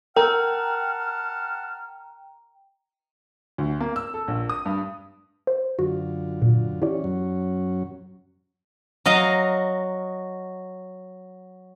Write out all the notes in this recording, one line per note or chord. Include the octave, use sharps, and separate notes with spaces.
A#4 F#5 G5 A5 A#5 F6
D2
A#3
E6
A4
A#1
D#6
G2
C5
F#2 D3 F4 F#4
A#2
E3 C#4 E4 G4 D5
F#2 F#3 C#4
F#3 D#5 F5 A#5